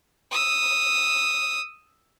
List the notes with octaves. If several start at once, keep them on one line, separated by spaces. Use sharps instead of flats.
D#6 E6